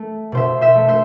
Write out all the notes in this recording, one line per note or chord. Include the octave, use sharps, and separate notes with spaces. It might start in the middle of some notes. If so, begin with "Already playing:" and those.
Already playing: A3
B2 C5 E5
C5 E5
A3
C5 E5